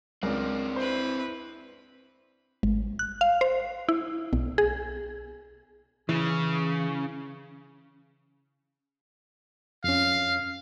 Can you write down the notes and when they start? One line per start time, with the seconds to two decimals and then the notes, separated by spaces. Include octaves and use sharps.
0.23 C#2 C4 D4 A#4 D5
0.76 E4 B4 C5
2.63 G#1
2.99 F#6
3.21 F5
3.41 C5
3.89 E4
4.33 B1
4.58 G#4
6.09 C#3 E3
9.84 F2 C#4 F5